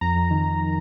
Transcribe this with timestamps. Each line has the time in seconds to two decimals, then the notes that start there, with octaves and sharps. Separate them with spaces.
0.01 F2 A#5
0.15 F2
0.31 D#3